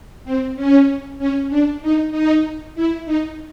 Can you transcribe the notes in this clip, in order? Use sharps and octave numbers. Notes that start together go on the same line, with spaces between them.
C4
C#4
C#4
D4
D#4
D#4
E4
D#4